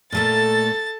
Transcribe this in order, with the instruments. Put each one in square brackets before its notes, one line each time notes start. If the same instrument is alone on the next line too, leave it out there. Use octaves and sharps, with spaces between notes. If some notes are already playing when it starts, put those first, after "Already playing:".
[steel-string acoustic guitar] A#2 A3 A#3 [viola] A4 A5 [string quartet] A6